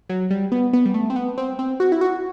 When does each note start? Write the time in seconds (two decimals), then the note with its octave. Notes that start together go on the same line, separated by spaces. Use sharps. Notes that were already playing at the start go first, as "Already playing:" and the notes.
0.09 F#3
0.31 G3
0.52 B3
0.73 B3
0.86 G3
0.94 A3
1.10 C4
1.16 B3
1.38 C4
1.59 C4
1.80 F#4
1.92 E4
2.01 F#4